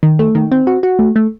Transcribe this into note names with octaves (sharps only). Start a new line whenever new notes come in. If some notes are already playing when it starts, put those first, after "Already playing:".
D#3
A3
D#3
C4
F#4
F#4
A3
A3